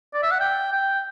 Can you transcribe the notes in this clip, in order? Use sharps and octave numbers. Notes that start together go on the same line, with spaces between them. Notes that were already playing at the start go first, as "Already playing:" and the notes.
D5
E5
F#5
G5
G5